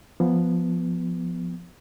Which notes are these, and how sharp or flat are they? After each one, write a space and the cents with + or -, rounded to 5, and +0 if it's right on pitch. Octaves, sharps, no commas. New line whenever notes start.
F3 +0 B3 +0